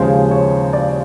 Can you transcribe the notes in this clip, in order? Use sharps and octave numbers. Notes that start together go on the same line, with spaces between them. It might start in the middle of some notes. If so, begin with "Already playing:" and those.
Already playing: D#2 C#3 F3 G#3 C5
C#5
D5